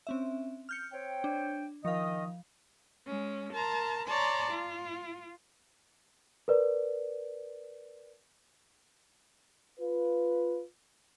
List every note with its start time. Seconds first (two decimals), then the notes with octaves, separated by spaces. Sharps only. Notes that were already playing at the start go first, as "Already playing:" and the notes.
0.07 C4 C#4 E5
0.69 F6 G6 C#7
0.93 C4 C#5 G5
1.24 D4
1.85 D#3 F3 D#5 F5
3.07 G#3 C#4
3.53 A#4 A5 A#5 C6
4.06 C#5 D5 A5 A#5 C6
4.51 F4
6.48 A#4 B4 D5
9.80 F4 B4